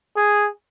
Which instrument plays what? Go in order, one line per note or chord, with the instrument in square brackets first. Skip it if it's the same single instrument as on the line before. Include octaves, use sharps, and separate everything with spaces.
[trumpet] G#4